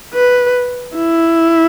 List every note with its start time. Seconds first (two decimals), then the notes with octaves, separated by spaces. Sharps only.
0.14 B4
0.95 E4